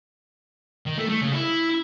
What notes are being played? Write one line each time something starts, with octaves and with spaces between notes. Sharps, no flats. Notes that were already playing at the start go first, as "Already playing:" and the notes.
D#3
A3
A3
C#3
E4